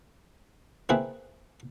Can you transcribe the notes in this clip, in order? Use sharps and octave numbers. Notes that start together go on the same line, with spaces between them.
A#3 C4 E4 G#4 B4